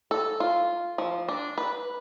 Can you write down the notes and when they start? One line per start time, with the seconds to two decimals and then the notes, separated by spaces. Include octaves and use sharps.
0.11 A4
0.40 F4
0.98 F3
1.28 D4
1.58 B4